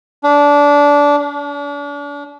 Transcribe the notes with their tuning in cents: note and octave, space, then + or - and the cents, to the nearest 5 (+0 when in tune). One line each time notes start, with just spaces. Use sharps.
D4 -20
D4 -40